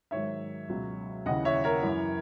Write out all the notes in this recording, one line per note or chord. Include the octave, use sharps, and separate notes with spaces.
G#2 D#3 F#3 C#5 E5
C#2 B2 F#3
D#2 C#3 E3 D#5 F#5
C#5 E5
A#4 C#5
F#2 E3